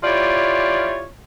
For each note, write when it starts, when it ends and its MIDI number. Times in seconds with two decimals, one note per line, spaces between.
0.03 1.05 64
0.03 1.05 65
0.03 1.05 67
0.03 1.05 73
0.03 1.05 74